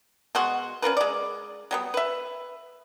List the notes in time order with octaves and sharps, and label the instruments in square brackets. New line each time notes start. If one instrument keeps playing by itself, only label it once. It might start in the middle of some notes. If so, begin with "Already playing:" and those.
[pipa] B2 G#3 F#4 C6
C#4 F4 A#4 B4
G#3 D5
F#3 G3 B3
B4 E5